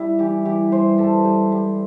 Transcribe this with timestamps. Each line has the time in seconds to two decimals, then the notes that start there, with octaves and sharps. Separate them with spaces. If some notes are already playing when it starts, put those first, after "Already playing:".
Already playing: G3 E4
0.19 E3 G4
0.45 E3 G4
0.72 G3 C5
0.98 G2 A4
1.25 G3
1.52 G3